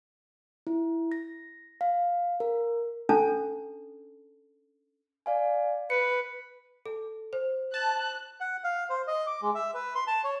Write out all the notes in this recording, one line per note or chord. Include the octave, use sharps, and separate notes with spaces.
E4
A#6
F5
A#4
C#4 D4 A4 A5
D5 F5 G#5
B4 C#7
A4
C5
A5 F#6
F#5
F5
C5
D#5
D6
G#3
E5
B4
C6
A5
C#5